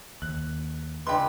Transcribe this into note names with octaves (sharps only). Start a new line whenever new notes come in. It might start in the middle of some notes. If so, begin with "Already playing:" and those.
D#2 F#6
C#2 D4 B4 G5 C6